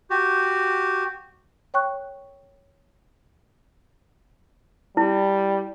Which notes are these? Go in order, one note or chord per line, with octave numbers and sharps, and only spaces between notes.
F#4 G4
C#5 G5 C#6 F#6
G3 E4